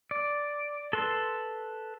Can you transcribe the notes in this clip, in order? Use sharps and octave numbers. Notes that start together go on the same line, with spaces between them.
D5
A4 B4 C6